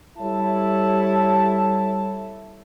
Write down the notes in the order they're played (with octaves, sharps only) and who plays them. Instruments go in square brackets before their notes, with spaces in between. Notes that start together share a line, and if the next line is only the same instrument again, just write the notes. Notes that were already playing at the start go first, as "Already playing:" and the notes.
[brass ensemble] G3 E4 A4 C#5 A5